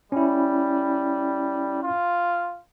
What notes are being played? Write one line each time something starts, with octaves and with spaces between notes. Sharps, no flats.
G3 C#4 E4
F4